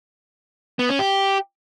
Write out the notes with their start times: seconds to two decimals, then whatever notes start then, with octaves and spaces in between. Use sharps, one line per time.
0.79 B3
0.89 C#4
0.99 G4